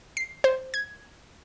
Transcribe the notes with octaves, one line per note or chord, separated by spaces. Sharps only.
C7
C5
G#6